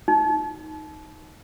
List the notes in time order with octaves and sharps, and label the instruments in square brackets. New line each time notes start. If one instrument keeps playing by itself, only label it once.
[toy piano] D#4